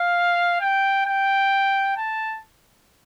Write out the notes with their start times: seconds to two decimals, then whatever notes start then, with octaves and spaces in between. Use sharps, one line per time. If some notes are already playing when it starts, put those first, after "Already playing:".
Already playing: F5
0.61 G5
1.06 G5
1.97 A5